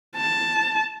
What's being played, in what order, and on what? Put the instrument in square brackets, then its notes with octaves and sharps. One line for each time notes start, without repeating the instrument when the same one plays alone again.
[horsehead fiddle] A5